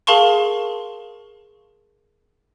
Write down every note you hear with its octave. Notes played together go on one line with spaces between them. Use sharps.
G#4 A#4 F5 A5 C6 C#6